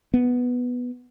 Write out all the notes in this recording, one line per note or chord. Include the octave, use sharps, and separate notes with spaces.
B3